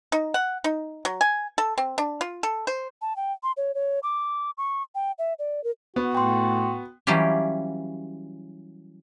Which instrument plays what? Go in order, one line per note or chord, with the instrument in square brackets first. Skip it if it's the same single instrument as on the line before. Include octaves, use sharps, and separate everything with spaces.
[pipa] D#4
F#5
D#4
F#3
G#5
A4
C4
D4
F4
A4
C5
[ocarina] A5
G5
C6
C#5
C#5
D6
C#6
G5
E5
D5
A#4
[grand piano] B3 [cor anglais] F#4
[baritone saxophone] A2 [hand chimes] G5 C6
[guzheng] E3 F#3 G3 C#4 F4 G4